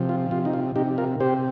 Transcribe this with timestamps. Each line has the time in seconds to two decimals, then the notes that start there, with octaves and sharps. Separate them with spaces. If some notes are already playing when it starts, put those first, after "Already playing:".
Already playing: C3 F3
0.09 F4
0.31 C3 F4
0.45 D#4
0.53 F4
0.76 C3 D#4 G4
0.98 F4 A#4
1.20 C3 G4 C5